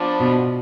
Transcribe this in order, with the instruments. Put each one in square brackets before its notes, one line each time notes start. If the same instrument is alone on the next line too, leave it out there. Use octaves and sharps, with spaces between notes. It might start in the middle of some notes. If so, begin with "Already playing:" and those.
Already playing: [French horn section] F3 B3 D4
[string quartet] B2